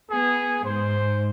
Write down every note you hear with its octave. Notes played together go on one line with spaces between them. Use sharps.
B3 G#4
G#2 C5